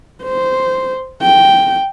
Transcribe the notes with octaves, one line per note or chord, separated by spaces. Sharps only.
C5
G5